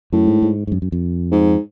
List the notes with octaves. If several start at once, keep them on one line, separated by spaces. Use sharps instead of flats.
F#2 A2
G#2
G#2
G#2
F#2
F#2
F2
G#2